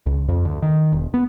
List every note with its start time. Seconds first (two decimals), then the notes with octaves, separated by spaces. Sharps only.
0.06 C#2
0.28 F2
0.45 D2
0.62 D#3
0.93 E1
1.14 B3